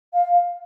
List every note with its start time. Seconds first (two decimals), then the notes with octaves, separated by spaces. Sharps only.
0.13 F5